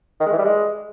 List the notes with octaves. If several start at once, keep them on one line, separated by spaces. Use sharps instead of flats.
D#3
G#3
E3
G3
G#3